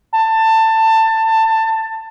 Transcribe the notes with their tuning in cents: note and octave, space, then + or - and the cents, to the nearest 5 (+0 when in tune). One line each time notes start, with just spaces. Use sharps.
A5 +20